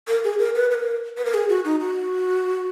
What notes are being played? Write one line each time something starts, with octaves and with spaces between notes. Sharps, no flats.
A#4
G#4
A#4
B4
B4
A#4
B4
A#4
G#4
F#4
D#4
F#4